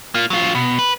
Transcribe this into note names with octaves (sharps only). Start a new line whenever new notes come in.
A#3 F4
F#3 F4
B2
B4